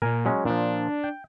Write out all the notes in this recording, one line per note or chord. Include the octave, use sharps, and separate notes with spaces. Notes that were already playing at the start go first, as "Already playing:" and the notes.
A#2 A#4 G#5
F#3 G#3 C#4
A#2 F3 D4
G5